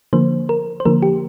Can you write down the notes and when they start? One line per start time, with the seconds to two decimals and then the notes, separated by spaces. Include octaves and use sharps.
0.13 D3 F3 A#3 C5
0.49 A#4
0.80 C5
0.85 D3 F3 A#3 A#4
1.02 G4